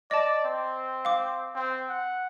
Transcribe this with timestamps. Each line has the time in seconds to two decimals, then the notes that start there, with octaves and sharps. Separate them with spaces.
0.11 D5 D#5 A5
0.44 C4
1.05 F5 D6
1.55 C4
1.89 F#5